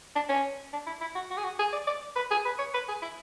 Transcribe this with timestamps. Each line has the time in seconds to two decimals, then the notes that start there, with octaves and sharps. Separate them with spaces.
0.15 D4
0.29 C#4
0.73 D4
0.87 E4
1.01 E4
1.15 F#4
1.30 F#4
1.37 G#4
1.44 F#4
1.59 G#4
1.73 D5
1.87 D5
2.16 B4
2.31 G#4
2.45 B4
2.58 C#5
2.74 B4
2.88 G#4
3.02 E4